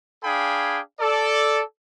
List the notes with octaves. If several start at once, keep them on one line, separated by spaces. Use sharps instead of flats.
D4 G#4 F5 G5 G#5 B5
A4 D5